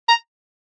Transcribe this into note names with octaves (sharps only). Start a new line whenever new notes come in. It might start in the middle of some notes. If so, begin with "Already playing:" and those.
A#5